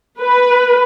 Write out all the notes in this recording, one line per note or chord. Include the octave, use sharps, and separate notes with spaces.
B4